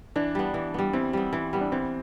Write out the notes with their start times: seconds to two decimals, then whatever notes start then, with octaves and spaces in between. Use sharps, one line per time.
0.16 E3 D4
0.35 G3 B3
0.54 E3
0.74 G3 B3
0.93 E3 C4
1.13 G3 B3
1.33 E3
1.53 G3 B3
1.61 D4
1.72 E3 C4